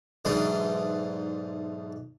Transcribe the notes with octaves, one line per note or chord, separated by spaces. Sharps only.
B1 G#2 E3 D4 D#4 C6